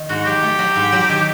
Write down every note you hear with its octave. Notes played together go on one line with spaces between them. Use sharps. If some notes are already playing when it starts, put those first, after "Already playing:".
Already playing: D#3
G#2 F#4
F#3 G4
A3
F#3
G#2
F#3
D#3